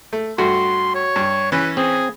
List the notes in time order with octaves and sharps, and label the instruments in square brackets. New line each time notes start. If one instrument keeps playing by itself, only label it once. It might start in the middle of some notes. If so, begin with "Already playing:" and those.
[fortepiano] A3
[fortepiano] G2 A3 [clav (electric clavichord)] F#4 [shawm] C6
[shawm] C#5
[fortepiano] G2
[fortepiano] E3 C#4 [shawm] B4
[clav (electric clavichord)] C4 [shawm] G#4